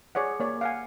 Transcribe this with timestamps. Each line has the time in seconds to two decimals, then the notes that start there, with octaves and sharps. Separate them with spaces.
0.15 G#4 C#5 D5 F#5
0.40 A#3 C#5 D5
0.61 F5 F#5 G#5